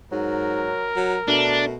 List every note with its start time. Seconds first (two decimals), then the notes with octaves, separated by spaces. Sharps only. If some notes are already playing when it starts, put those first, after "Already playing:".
0.12 G#2 F#3 A#4
0.96 F#3
1.28 B2 A3 D4